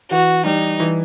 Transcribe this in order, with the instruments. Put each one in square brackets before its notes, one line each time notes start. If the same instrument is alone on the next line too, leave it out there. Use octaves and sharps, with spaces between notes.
[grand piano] E3 [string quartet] F#4
[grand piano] G3 [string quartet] D#4
[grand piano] E3